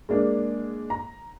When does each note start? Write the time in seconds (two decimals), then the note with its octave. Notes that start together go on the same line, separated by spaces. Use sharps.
0.09 G#3 A#3 D4
0.90 A#5